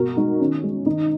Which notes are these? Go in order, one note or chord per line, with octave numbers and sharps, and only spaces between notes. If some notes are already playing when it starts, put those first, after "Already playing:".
Already playing: B2 F#4 A#4
G#3 D#4
D#3 C#4
G#3
D#3 D#4